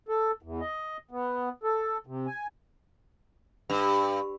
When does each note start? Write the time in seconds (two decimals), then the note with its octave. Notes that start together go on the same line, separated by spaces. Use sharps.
0.08 A4
0.42 E2
0.60 D#5
1.11 B3
1.63 A4
2.07 C3
2.27 G#5
3.70 G2